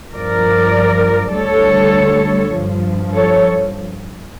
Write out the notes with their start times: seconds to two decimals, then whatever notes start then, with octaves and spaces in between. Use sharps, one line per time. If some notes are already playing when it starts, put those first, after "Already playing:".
0.14 G2 F3 A#4 D5
1.34 D2 D3 G3 A4 C#5
2.54 F3
2.60 G2
3.15 A4 C#5